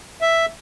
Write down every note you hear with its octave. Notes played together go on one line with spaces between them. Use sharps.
E5